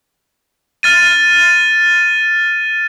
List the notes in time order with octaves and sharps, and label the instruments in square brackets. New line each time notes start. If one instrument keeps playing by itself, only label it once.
[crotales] F6 A6 D#7